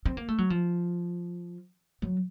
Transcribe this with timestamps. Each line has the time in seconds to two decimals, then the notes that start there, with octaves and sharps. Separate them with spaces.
0.05 C4
0.17 A#3
0.28 A3
0.38 F#3
0.50 F3
2.02 F#3